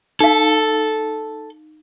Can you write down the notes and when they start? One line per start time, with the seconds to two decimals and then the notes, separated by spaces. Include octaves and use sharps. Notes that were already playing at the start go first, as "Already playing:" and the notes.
0.21 D#4 A4 F5